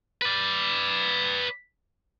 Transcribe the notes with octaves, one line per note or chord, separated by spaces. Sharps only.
B4 D5